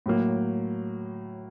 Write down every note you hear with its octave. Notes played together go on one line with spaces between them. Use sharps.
A2 F#3 A#3